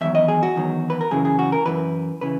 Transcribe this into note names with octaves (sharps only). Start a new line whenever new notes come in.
E2 D#3 F#3 E5
D#5
G#4
F#4
E2 D#3 F#3
B4
A#4
F#2 C#3 E3 G#4
G#4
F#4
A#4
F#2 C#3 E3 B4
C#3 E3 B4